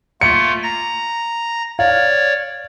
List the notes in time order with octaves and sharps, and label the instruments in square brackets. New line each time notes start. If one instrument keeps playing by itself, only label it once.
[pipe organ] A3 A#3 F4 [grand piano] C#7
[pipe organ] A#5 A#6
[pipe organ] C#5 D5 [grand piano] F5